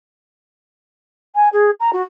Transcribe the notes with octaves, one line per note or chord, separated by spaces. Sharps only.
G#5
G#4
A#5
F#4